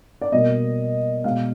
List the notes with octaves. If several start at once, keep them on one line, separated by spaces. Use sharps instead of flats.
D5
B2 G3 A#3 D#5
B2 G#3 F5